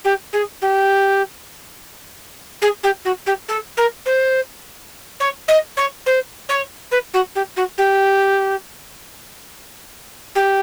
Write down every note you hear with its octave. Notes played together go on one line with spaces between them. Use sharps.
G4
G#4
G4
G#4
G4
F#4
G4
A4
A#4
C5
C#5
D#5
C#5
C5
C#5
B4
F#4
G4
F#4
G4
G4